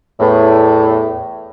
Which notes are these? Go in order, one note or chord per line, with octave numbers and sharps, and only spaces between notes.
E2 A2